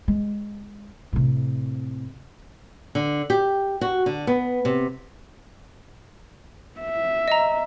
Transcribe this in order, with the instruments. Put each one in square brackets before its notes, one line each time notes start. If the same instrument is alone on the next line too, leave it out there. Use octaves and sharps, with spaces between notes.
[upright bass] G#3
A2 C3
[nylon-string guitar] D3
G4
F#4
D3
B3
C3
[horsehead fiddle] E5
[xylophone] D#5 A#5